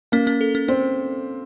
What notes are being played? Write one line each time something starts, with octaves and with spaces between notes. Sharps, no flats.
A#3 C#4
C#4
A4
C#4
C4 C#4